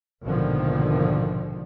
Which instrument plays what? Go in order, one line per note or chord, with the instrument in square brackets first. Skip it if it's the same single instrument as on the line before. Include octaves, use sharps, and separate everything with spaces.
[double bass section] A#1 G#2 B2 D3 D#3 F3